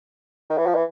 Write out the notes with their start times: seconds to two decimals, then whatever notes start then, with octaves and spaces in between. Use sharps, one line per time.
0.50 D#3
0.58 E3
0.67 F3
0.75 E3